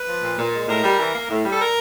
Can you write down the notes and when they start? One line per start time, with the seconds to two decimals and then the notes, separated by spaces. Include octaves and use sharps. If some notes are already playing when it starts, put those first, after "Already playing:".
Already playing: B4
0.08 F3
0.22 A#2
0.38 A#2
0.53 G#3
0.68 A2 A#4
0.83 G3
0.99 E3
1.14 A#3
1.29 A2
1.45 G3
1.50 A4
1.60 A#4